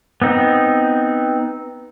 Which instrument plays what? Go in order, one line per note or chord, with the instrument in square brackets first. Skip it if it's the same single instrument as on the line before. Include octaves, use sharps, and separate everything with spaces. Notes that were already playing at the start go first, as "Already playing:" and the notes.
[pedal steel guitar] B3 C4 D#4